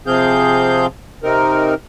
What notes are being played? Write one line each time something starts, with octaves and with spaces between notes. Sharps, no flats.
C3 F3 C4 G#4 F5 G6
C3 C4 D#4 A#4